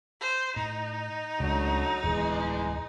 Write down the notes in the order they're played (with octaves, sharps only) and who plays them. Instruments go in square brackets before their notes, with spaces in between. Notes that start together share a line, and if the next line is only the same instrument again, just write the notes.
[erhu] C5
[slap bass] A2 [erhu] D#4
[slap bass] C#2 C#3 [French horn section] F#3 A3 D4
[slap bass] D1 E2 [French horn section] E3 G#3